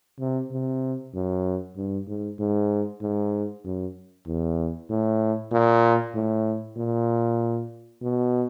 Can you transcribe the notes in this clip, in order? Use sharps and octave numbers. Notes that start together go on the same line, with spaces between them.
C3
C3
F#2
G2
G#2
G#2
G#2
F#2
E2
A2
A#2
A2
A#2
B2